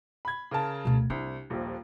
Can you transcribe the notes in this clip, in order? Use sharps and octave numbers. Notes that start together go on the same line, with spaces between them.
B5 G#6
C#3 A#4 A5
D2 B2
C2 D4
D#1 A#1 D#2